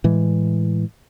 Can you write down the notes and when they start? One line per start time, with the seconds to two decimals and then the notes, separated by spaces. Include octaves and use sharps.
0.04 A2 E3 G#3